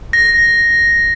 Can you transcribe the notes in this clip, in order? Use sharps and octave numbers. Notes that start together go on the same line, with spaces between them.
A#6